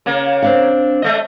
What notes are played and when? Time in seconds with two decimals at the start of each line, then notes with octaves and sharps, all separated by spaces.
0.06 C#3 A#3
0.42 C4 D4 F5
1.02 G#3 A3 D#5